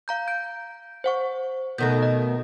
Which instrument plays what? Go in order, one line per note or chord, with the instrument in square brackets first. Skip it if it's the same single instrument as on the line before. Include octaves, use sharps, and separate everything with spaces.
[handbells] F5 A#5 G6
G6 D7
C5 F#5 C#6
[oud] B2 D#3 A3 [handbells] G6 A#6
[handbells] D#5